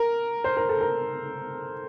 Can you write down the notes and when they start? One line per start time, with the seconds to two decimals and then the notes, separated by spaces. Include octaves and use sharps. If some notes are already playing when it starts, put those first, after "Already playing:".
Already playing: A#4
0.44 C5
0.57 A#4
0.69 A4
0.81 A#4